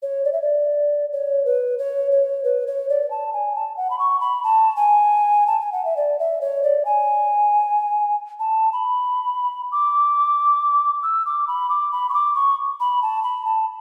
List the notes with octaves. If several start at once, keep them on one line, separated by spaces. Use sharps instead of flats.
C#5
D5
E5
D5
C#5
B4
C#5
C#5
B4
C#5
D5
A5
G#5
A5
F#5
B5
C#6
B5
A5
G#5
A5
G#5
F#5
E5
D5
E5
C#5
D5
G#5
A5
B5
D6
E6
D6
B5
D6
B5
C#6
D6
C#6
B5
A5
B5
A5